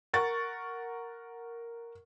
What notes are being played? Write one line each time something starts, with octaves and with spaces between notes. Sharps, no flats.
A#4 F#5 C#6 A6